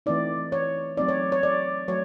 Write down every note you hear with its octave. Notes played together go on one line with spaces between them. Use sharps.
E3 A3 C4 D#4 D5
C#5
F#3 A3 C4 D#4 D5
C#5
C#5
D5
F#3 A3 C#5